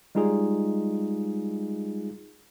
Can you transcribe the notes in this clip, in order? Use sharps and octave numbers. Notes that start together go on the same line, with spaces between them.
G3 G#3 D#4 F4 G#4